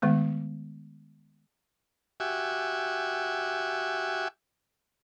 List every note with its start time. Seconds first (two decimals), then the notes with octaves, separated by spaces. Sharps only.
0.02 D#3 G#3 A3 B3
2.20 F#4 G4 E5 G#5